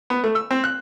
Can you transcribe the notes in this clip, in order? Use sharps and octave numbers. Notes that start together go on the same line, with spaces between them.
B3
A3
E6
C4
F#6